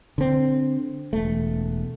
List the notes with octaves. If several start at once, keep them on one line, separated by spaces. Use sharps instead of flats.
D3 C4
E1 A3